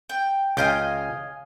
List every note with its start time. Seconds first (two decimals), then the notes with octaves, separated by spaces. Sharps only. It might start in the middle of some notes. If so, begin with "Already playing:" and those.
0.09 G5
0.57 C#2 D#5 F5 G5 G#5